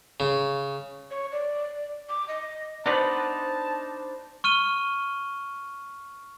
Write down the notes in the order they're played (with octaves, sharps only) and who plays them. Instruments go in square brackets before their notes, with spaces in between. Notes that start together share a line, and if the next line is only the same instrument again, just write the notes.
[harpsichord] C#3
[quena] C#5
D5
D6
D#5
[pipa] B3 F#4 D5 [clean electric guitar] D4 D#4 B4 [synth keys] C5 [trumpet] A5
[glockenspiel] C#6 F6 D#7 G7